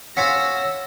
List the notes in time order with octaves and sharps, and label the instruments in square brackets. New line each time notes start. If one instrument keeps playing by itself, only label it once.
[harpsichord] C#4 F4 C5 [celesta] F#5 B6 C#7 [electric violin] E6 A#6